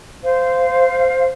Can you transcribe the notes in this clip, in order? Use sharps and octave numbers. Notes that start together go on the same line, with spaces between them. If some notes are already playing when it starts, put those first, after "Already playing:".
C5 F5